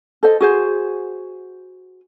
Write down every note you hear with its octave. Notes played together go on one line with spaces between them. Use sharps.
A4 C5 D#5
F#4 G#4 C5